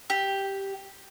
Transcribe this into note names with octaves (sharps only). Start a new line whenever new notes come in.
G4